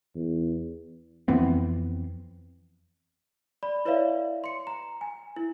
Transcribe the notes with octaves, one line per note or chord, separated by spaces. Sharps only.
E2
F2 E3 B3 C4
D5 B5
E4 B4 C#5 D5 E5 F5
C6 C#7
A#5
G#5
E4